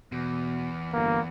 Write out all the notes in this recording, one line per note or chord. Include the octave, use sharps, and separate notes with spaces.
E2 B2
G1 A#3